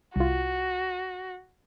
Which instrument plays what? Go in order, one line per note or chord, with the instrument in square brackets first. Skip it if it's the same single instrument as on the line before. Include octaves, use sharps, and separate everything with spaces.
[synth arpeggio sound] C2 F4 [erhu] F#4